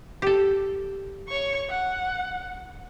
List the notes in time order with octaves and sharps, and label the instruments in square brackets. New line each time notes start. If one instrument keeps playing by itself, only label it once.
[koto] G4 A4
[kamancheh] C#5 C#6
F#5